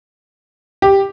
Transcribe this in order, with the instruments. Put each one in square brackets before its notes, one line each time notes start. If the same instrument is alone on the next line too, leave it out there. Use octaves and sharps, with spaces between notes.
[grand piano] G4